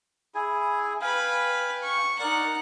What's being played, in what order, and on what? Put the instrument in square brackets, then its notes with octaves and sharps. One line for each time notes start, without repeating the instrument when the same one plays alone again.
[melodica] E4 G#4 G#5
[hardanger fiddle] B4 B5 [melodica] F5 G5 G#5
[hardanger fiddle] C#6
[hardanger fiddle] D#4 F#5 [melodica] A#4 D5